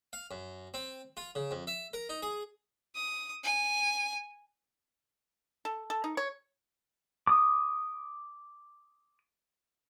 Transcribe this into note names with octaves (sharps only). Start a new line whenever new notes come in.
F5
F#2
C4
F4
C#3
F2
E5
A#4
D#4
G#4
D#6
G#5
A4
A4
D#4
C#5
D6 D#6